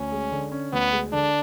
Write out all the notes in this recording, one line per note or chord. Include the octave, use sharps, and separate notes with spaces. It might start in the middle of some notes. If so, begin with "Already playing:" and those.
Already playing: D2 C#4
G#3
D3
C#4
D2 B3
G#3
D3 D4